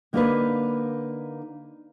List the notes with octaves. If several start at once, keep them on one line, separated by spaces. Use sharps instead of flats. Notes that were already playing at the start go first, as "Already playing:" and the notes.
D3 A#3 D#4 G4 A#4 B4